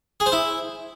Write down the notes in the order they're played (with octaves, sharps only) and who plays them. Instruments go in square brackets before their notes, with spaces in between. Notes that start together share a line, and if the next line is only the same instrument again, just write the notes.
[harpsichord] G#4
C5
E4